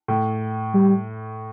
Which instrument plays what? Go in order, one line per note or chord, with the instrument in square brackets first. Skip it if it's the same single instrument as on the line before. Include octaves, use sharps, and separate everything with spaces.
[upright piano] A2
[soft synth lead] G3